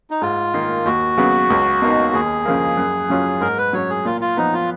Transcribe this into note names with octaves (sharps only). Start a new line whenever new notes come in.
D#4
G#2 F4
D#3 A#3
D#2 F#4
C#3 F#3 B3
C#2
B2 A#3 D#4
D#2 G#4
C#3 F3 A#3
F#2
C#3 F#3 C#4 F4
G#2 A#4
B4
F#3 C#4 C#5
G#4
A#2 F4
F4
F3 B3 D#4
F4